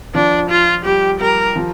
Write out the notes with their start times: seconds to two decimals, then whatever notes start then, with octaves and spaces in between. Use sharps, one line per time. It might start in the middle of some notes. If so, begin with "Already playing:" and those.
0.14 F3 D4
0.50 F4
0.85 G3 G4
1.20 G3 A#4
1.56 F3